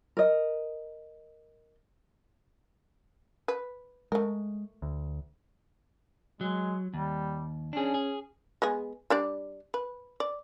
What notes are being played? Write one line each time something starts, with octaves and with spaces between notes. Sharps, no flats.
A#4 D#5
B4
G#3 A3 A#4
D2
F#3 G#3
D#2 G3
C#4 D4 G#4
G#4
G#3 B3 G#4
G3 D4 D5
B4
D5